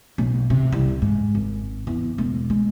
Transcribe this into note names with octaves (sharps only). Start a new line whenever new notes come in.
B1
C3
C2
G#2
G#1
E2
E1
G#3